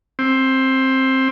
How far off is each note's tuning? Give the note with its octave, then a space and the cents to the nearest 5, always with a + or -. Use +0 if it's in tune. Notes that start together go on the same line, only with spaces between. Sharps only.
C4 +15